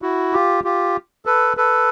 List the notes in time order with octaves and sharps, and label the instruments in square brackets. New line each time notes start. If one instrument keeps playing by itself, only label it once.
[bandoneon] E4 F#4
F4 G4
F4 G4
A4 B4
A4 B4